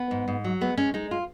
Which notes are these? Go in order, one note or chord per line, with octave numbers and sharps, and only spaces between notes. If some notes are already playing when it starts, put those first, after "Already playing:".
Already playing: B3
G#2
G#2
F#3
G#3 B3
G#3 C#4
G#3 D#4
F4